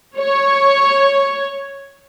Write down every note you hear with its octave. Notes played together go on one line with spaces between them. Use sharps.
C#5